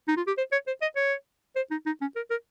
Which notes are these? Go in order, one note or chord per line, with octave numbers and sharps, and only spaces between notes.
D#4
F4
G4
C5
C#5
C5
D#5
C#5
C5
D#4
D#4
C#4
A#4
A#4